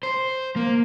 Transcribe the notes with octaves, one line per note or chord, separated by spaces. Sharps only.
C5
A#3